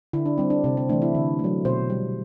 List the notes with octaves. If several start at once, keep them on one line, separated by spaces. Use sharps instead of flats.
D3 E4
D4
G3 C4
D4
C3 C4
C4
E3 A3 D4
E4
D3
F#3 A3
B2 C5
G3